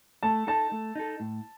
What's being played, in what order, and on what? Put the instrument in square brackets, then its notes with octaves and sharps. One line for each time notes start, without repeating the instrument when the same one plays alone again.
[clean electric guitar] A3 [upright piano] A5
[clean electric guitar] D#4 A4 [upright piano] A5
[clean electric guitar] A3
D#4 A4
A2